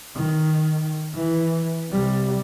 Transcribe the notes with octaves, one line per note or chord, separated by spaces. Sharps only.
D#3
E3
C3 G3